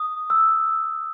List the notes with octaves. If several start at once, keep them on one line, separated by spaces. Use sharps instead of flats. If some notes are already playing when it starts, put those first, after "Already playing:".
Already playing: D#6
E6